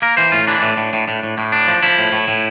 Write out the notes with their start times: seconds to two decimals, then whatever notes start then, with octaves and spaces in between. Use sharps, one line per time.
0.02 A#3 A#4
0.17 E3 C5
0.32 A2 F4
0.47 E3 D4
0.62 A2
0.77 A2
0.93 A2
1.08 A2
1.23 A2
1.38 A2
1.52 D4
1.68 F3
1.83 F3 E4
1.99 A2
2.13 A2
2.28 A2